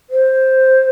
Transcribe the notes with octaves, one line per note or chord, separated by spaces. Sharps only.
C5